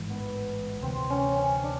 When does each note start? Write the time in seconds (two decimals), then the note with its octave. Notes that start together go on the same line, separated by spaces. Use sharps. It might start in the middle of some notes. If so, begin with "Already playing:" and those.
Already playing: A1 G#2 E3 G#3
0.10 B3
0.82 D2 C3 E3 C4
1.10 C#4
1.37 C#4
1.63 D4